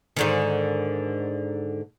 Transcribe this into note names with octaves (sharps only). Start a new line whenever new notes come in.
G#2 D3 D#3